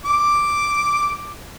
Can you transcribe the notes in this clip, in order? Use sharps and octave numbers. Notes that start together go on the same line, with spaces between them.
D6